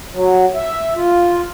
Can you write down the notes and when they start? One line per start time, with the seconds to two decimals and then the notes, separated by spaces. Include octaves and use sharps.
0.13 F#3
0.55 E5
0.96 F4